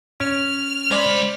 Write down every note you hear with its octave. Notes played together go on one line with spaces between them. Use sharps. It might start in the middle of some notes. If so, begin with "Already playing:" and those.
C#4 F6
G#3 C5 D5 B5